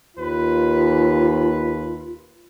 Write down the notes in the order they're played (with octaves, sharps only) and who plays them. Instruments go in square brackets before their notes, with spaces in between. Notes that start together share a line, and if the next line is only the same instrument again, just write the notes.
[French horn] D#2 [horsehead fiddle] F4 [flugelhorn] B4